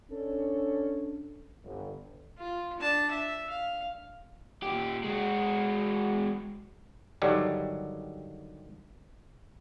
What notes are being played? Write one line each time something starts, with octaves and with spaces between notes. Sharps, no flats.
C#4 D4 A4
G1
F4
D4 A5
E5
F5
A#2 G4
G#3 F#4
G2 D3 D#3 F#3 G3